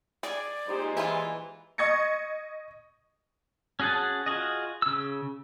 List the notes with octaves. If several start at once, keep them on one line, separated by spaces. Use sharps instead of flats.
G#4 D5
A#2 G#3 D#4 G4 C5
E3 E4 F4 G#5
D#5 C#6 G#6 A#6 C#7
C#4 F#4 G#4 F#5 A5
F4 F#4 G#4 D#5
C#3 E6